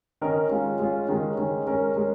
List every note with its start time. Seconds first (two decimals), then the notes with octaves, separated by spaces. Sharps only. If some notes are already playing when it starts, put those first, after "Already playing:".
0.21 D#3 C#4 A#4 D#5
0.51 G#3 C#4 F4
0.79 G#3 C#4 F4
1.09 D#3 G#3 C#4
1.38 D#3 G#3 C#4
1.67 G#3 C#4 A#4
1.96 G#3 C#4 A#4